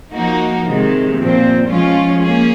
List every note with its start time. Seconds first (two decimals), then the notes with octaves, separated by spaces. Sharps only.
0.14 F3 A#3 D#4 F#4
0.65 C3 D#3 G#3
1.18 A#2 F3 C4
1.70 F3 G#3 C#4 F4
2.22 A#3 C#4 G#4